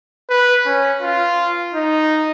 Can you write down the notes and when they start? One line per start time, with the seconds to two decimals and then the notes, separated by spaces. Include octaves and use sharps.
0.30 B4
0.66 C#4
1.02 F4
1.74 D#4